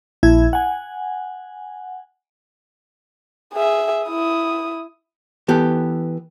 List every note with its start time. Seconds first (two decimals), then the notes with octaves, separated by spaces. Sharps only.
0.23 A#1 E4 E5 G#6
0.53 F#5 G#5
3.53 G#4 E5
4.06 E4 D#6
5.48 E3 B3 G4 A4